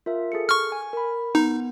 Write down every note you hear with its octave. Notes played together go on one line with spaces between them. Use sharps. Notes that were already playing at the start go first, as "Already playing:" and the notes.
F4 A#4 E5
G#4 A4 C#7
C#6 F6
G#5
A#4 B5
B3 D#4